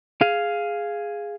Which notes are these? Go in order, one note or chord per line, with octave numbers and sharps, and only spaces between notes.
G#4 F5